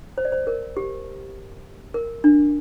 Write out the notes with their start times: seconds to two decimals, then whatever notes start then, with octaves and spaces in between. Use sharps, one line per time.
0.18 C5
0.25 D5
0.32 C5
0.47 A#4
0.77 G4
1.94 A#4
2.24 D4